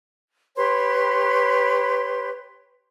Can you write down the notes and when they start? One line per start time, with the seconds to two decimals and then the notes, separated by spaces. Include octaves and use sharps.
0.56 G4 B4 C#5 C6